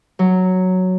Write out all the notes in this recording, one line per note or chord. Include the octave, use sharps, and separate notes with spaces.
F#3